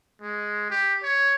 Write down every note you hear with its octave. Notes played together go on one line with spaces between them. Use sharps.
G#3
G4
C#5